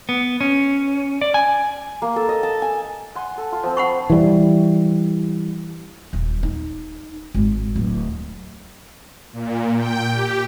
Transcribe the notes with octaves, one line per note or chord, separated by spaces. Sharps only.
B3
C#4
D5
G#5
A#3
A4
D#5
A5
G#5
F#5 G#5 C6
A4
F4
F3 C4
F#5 B5 C#6
E3 G3
D#1
D#4
G#1
D1
A#2
G5
G4